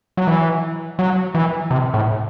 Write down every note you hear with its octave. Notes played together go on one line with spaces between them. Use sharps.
F#3
E3
F#3
E3
C3
A2